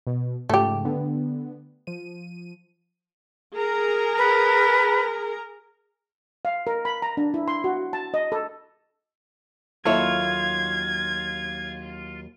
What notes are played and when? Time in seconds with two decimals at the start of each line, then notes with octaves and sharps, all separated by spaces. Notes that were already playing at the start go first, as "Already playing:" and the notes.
0.07 B2
0.49 G#2 C#3 F3 A3 G4
0.85 D3 B3
1.87 F3 D#7
3.57 G#4 A#4 A#5
4.18 B4
6.45 F5
6.67 A#4
6.85 B5
7.02 A#5
7.17 D4
7.34 E4
7.48 C6
7.64 F#4
7.93 A5
8.14 D#5
8.32 A4
9.85 D#2 F#3 E4 F4 A4 C#5 G#6